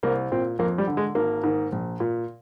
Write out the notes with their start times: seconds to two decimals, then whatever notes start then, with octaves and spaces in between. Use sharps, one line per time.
0.03 C2 A#3
0.32 A#2 C4
0.59 F2 A#3
0.78 G3
0.87 D3
0.97 G#3
1.15 G#1 A#3
1.43 G#2 D#3
1.72 A#1
2.00 A#2